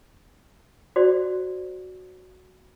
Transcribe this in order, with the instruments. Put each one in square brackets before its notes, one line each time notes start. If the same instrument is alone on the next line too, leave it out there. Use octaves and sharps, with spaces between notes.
[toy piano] F#4 C5 D5